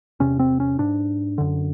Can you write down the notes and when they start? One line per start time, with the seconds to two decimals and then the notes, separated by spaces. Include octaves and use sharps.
0.20 E2 C3 C#4
0.39 C4
0.60 C#4
0.78 G#2 D4
1.38 F#2 D3